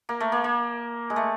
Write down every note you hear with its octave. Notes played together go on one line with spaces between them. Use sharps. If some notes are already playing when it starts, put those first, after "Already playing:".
A#3
A3
A#3
A#3
G#3
A3